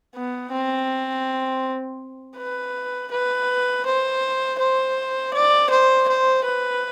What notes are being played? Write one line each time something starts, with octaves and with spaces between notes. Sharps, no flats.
B3
C4
B4
B4
C5
C5
D5
C5
C5
B4